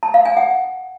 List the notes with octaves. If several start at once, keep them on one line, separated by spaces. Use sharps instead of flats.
A5
F5
G#5
F#5